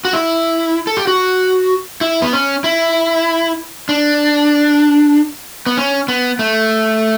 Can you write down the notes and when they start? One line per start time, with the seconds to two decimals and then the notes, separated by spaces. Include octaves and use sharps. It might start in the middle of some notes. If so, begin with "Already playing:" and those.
0.05 F#4
0.13 E4
0.87 A4
0.97 G4
1.07 F#4
2.01 E4
2.22 B3
2.33 C#4
2.64 E4
3.89 D4
5.66 B3
5.77 C#4
6.08 B3
6.39 A3